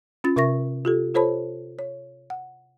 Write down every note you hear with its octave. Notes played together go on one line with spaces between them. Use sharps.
C#4 F4 A6
C3 A#4 E5 C#6 A#6
F4 G4 A4
F4 A4 C5 C#5 A5 B5
C#5
F#5